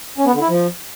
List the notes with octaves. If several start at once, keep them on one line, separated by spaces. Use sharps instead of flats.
C#4
B3
D3
E4
F3